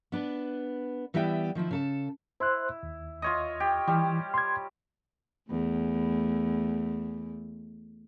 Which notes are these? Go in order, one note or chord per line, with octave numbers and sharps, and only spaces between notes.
B3 D4 B4
E3 G3 B3 E4 E5 G5
D#3 F3 C4 E4
C#3 A4 A5
E4 C5 C6 F#6
D#2
F4 C#5 D#5
G4
E3 G3
C6 G#6
E2 A3